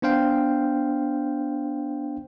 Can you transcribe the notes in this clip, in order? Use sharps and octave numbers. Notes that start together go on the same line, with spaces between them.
B3 D4 C5 F5 G5